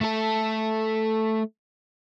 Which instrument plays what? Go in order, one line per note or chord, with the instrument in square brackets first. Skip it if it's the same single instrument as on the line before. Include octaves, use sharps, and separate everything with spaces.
[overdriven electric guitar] A3 A4